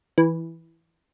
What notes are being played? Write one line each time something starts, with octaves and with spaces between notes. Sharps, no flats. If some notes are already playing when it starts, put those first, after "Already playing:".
E3